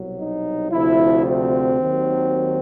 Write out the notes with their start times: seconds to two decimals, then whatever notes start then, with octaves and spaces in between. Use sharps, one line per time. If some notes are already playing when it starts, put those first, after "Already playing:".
Already playing: C2 B2 F#3
0.19 D#4
0.72 D2 C3 F3 E4
1.25 C4
1.78 D#2 D#3 F#3